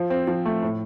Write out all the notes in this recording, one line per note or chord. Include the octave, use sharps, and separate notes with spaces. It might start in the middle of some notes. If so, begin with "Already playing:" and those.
Already playing: F3
C4
F3
A3
A2